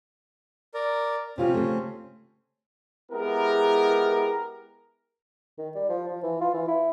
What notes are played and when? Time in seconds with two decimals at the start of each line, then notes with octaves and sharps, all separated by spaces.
0.74 A#4 D5
1.38 C3 C4 C#4 F4 G4
1.54 C#3 A3
3.12 G#3 B3 E4 G4 G#4 A#4
5.58 D#3
5.75 G3
5.89 F3
6.08 F3
6.23 E3
6.41 F4
6.54 E3
6.68 E4